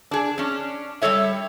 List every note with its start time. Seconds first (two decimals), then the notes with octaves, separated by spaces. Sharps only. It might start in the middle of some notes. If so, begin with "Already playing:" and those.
0.11 D4 G#4
0.38 C#4 D4
1.02 G3 A3 A4 C#5 E5